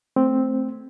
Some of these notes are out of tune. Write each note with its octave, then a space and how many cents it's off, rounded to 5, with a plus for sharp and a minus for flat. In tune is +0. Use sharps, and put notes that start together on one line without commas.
A3 +0 C4 +0